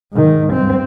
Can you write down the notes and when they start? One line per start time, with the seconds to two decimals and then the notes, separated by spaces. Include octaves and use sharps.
0.12 G#2 D#3
0.53 G2 C4